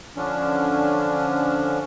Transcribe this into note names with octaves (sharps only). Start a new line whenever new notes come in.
D3 F3 C#4 D4